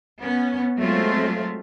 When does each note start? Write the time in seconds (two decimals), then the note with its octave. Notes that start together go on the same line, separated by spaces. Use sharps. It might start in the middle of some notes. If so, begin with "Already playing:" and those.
0.21 B3 C#4
0.77 F#3 G#3 A3 C4 F4